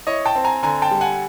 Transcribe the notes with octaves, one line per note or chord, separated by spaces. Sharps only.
E4 C#5 D#5
G5 A5
C4
G#5 A#5
D3 G#5 A#5
G5 A5
G3
F#5 G#5